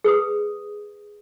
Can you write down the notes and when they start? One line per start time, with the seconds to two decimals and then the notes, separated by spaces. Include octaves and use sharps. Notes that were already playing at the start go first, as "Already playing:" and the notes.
0.04 G#4 B4 D#6